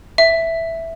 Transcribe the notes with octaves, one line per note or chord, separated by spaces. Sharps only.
E5